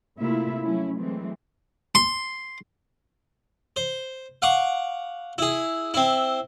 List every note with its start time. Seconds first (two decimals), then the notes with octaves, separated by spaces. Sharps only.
0.18 C3 A3 A#3 E4 F4 E5
0.62 F3 F#3 A3 C#4 E4
0.97 E3 F#3 G#3 A3 C4
1.95 C6
3.76 C5
4.42 F5 F#5 C#6 D6
5.38 E4 G#4
5.94 C4 E4